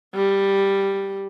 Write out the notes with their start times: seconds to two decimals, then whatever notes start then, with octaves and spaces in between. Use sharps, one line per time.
0.15 G3